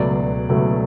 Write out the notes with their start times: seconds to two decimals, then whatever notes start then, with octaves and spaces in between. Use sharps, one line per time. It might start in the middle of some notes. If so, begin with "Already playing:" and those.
Already playing: C#2 B2 F#3 A3 D5
0.49 C#2 B2 F#3 A3